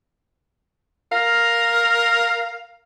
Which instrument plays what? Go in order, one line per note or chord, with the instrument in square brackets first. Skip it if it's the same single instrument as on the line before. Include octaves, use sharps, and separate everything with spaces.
[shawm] A#4 [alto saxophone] F5